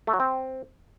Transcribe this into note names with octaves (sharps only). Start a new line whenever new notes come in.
A3
F#3
C4